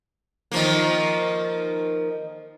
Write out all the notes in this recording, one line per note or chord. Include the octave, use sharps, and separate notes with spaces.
D#3 F3 A#3